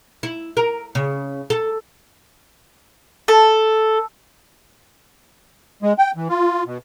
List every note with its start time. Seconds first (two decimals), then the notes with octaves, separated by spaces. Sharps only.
0.23 E4
0.57 A#4
0.95 C#3
1.50 A4
3.28 A4
5.83 G#3
5.98 G5
6.16 E3
6.29 F4
6.66 B2